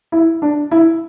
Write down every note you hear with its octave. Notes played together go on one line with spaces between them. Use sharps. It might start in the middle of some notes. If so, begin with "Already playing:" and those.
E4
D4
E4